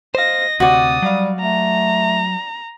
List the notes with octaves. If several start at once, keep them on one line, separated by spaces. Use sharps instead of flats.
C5 D#5 F5 A#6
D2 C3 F#4 D5 D#6
F#3 G3 F5
A3 A#5